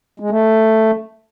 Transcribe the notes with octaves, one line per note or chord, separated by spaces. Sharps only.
G#3
A3